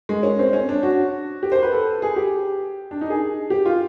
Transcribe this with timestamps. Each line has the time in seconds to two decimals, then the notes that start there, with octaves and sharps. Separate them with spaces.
0.09 G#3
0.23 C#4
0.39 C4
0.53 C#4
0.69 D4
0.83 F#4
1.43 G4
1.52 C5
1.63 B4
1.72 A4
2.02 G#4
2.16 G4
2.91 D4
3.01 D#4
3.10 G#4
3.50 G4
3.65 F4